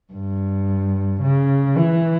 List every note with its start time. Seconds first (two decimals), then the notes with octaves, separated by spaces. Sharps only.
0.13 G2
1.22 C#3
1.77 E3